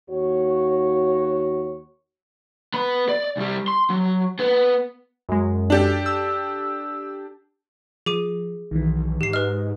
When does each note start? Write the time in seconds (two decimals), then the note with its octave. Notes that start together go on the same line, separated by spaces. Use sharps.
0.10 D#2 F#4 C#5
2.74 B3 B5
3.09 D5
3.37 C2 G3
3.68 C6
3.90 F#3
4.39 B3 B4
5.29 F#2 G#3
5.70 D4 G4 A4
6.06 E6
8.06 F3 G#4 D6 D#7
8.71 B1 D#3 E3
9.21 G#2 G4 C7
9.33 B4 D#5 F6